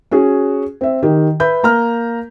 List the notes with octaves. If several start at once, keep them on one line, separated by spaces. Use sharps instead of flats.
C#4 F#4 G#4
C4 E5
D#3 G4
B4 E5 B5 G6
A#3 A#5 F6